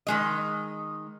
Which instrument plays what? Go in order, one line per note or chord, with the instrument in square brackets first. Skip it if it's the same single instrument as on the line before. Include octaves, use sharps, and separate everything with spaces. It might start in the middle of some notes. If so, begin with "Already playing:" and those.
[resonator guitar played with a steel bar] D#3 G#3 D#5